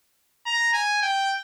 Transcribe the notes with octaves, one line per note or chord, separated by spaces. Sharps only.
A#5
G#5
G5